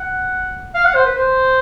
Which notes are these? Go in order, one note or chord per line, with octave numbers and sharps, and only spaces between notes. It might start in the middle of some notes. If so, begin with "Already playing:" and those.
Already playing: F#5
F5
F#5
C5
B4
C5